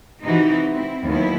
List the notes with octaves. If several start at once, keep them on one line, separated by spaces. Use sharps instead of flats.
C3 E3 D#4 F#4
C4 E4
D#2 F#3 B3 E4